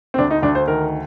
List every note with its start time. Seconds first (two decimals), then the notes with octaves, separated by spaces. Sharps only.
0.14 C4
0.18 D2 D4
0.30 D#4
0.42 D2 D4
0.55 C5
0.68 D#3 A#4